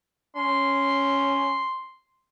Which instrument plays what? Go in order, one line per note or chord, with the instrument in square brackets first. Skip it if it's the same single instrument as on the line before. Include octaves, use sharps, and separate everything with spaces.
[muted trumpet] C#4 [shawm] C6